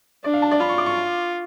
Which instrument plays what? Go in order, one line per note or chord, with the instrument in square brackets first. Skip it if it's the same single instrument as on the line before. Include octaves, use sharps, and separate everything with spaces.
[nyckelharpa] D4 [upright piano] D5
[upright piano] F5
A5
D5
[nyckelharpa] F4 [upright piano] B5
[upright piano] C#6
D6
C#6